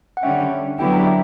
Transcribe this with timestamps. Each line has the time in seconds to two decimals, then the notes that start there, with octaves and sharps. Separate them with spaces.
0.17 F#5
0.22 D3 G3 C#4 E5 G5
0.79 D3 F#3 B3 E4 G4 G5
0.93 A#5
1.06 E5 G5